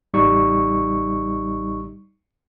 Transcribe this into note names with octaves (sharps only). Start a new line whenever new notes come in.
A1 G3 D#4 C#6